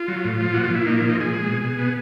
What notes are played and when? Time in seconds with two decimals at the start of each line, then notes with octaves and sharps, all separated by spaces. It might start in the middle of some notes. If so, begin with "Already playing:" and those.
Already playing: F4
0.08 F#3
0.25 A2
0.40 F3
0.54 A#2 F#4
0.64 F4
0.71 A#2 E4
0.86 A#3 D#4
0.98 E4
1.02 F3
1.09 D#4
1.18 A#2 G#4
1.33 G#3
1.49 B2
1.64 B2
1.79 B3